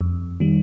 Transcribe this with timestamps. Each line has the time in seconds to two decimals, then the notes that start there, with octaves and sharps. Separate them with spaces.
0.01 F2
0.40 D#3 G3